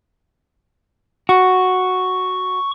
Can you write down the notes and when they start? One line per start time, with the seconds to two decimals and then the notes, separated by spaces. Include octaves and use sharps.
1.29 F#4 C#6